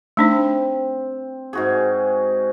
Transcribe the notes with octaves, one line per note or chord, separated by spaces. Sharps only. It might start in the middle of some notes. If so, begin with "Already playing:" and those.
A3 C4 D4 D#4
G#2 F#4 G#4